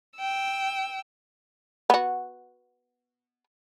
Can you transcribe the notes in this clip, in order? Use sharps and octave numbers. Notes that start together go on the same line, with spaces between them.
G5 E6
B3 F#4